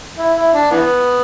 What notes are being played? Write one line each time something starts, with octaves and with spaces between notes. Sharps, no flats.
E4
E4
D4
E3 B3